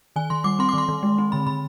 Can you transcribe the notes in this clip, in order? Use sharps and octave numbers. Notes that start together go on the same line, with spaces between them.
D#3 G#5
D#3 C6
G3 D6
C4 C6
D6
D#3 C6
D#3
G#3
C4
D3 B5
D3 B5